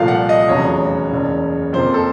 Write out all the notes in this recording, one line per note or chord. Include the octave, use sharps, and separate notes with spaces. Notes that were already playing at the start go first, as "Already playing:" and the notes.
Already playing: C2 A#2 F3 A3 F5
F#5
D#5
F1 E2 C#3 F#3 C#5
F#1 E2 C#3
F2 C3 F3 A#3 C5
A4